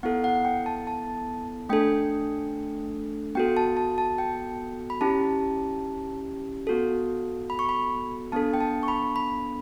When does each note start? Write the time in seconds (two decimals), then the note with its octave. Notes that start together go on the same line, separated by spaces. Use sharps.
0.03 B3 E4 A4 F#5
0.24 F#5
0.45 G5
0.66 A5
0.87 A5
1.69 A3 D4 A4 G5
3.35 B3 F#4 A4 G5
3.57 A5
3.77 A5
3.98 A5
4.18 G5
4.90 B5
5.01 C#4 E4 G4 A5
6.67 B3 F#4 A4
7.50 B5
7.59 C#6
7.69 B5
8.32 B3 D4 A4 A5
8.54 G5
8.61 A5
8.83 C#6
8.88 B5
9.16 B5